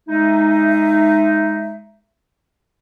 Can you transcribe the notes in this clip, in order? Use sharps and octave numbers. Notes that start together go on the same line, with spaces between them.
G#3 D#4 E5